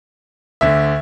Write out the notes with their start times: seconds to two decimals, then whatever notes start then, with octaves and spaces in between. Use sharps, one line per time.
0.61 D2 D3 E5